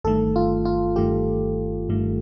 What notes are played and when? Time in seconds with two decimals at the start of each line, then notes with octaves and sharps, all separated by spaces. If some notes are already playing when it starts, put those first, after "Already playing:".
0.04 G1 G2 D#3 A3 A4
0.36 F4
0.65 F4
0.96 G1 G2 D#3 A3 G4
1.89 G1 G2 D#3 A3